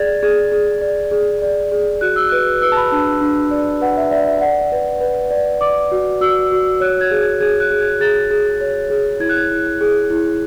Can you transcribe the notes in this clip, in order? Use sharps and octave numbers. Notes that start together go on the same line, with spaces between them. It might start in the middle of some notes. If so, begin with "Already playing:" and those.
Already playing: G#4 D5 G#6 A6
G#4 G#6
G#4
D5
G#4
D5
G#4
F#4 F#6
E6
B4 F#6
B4 E6
A5
B5
D4 A5
D4
D5
B4 F#5
E5
D5 E5
E5
D5 F#5
B4
B4
D5
D5 D6
F#4
F#4 E6
F#4
C#5 F#6
G#6
G#4
G#6
G#4 G#6
F#6
G#4
G#6
G#4 A6
G#4
C#5
G#4
E4 G#6
F#6
G#6
E4
G#4
E4